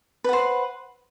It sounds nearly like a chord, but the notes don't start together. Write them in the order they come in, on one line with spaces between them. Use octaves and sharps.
B4 F#5 C5